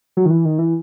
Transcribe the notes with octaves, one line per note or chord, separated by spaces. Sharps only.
F#3
D#3
E3
D#3
E3